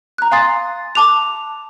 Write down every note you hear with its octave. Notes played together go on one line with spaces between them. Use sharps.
A#5 F#6
F5 G#5 C6 D#6 A6 C7
A5 D6 F#6 F7